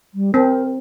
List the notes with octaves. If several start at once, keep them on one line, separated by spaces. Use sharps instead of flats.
G3
C4 A#4